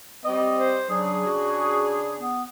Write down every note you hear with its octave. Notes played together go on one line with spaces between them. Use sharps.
G3 C4 D#5
C5
C#3 F#3 D4 G#4
F#4
B3